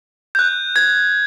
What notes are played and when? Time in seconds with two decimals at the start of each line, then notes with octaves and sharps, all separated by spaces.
0.35 G6
0.39 F#6
0.76 G#6